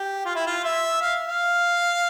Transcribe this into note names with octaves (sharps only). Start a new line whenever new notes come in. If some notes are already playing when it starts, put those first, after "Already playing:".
Already playing: G4
F4
E4
F4
E5
F5
F5